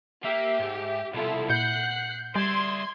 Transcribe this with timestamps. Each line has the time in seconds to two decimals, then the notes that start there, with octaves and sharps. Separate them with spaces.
0.24 A#3 G4 E5
0.59 G#2
1.14 C2 B2 E4 F4 A4
1.49 A#2 F#5 F#6 G6 C7
2.35 G3 D5 E5 C6 G#6